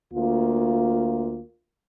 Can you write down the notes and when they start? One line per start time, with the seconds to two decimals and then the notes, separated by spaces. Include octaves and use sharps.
0.14 D2 A#3 F4